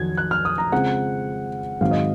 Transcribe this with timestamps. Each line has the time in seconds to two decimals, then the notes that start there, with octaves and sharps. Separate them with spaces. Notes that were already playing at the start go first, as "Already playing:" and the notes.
Already playing: F2 D#3 F#3 G#6
0.17 F#6
0.31 F6
0.45 D#6
0.58 A#5
0.72 C#3 G#3 C4 F4 F#5
1.81 G#2 D#3 F#3 C4 F5
1.91 D#5